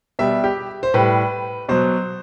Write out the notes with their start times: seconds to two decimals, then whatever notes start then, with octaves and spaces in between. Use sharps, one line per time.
0.19 B2 G3 E5
0.44 G4
0.83 C5
0.94 A2 G3 B4
1.69 B2 F#3 C5